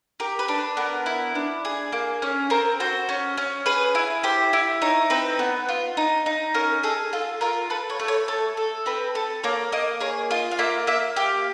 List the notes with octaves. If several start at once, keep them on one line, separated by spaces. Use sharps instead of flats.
G4 A#4
B4
D4
B4
B3 A#4
E4
D4
G#4
A#3
C#4
C4 A#4
F#4 C5
C#4
C#4
G#4 B4
E4
G4 C5
E4
D#4 C#5
C4 B4
B3
F4
D#4
D#4
C#4 A#4
G#4 A4
F4 A4
F4 A#4
A4 B4
C#5
A3
C#5
A4 C#5
A4
C4 B4
A4
A#3 C#5
A#3 D#5
G#4 C#5
F4 D#5
F5
A#3 E5
A#3 E5
G4 F5